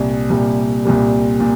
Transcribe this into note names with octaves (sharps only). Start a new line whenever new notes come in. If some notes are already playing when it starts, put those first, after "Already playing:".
Already playing: C2 A#2 G3
C2 A#2 G3
C2 A#2 G3
A#2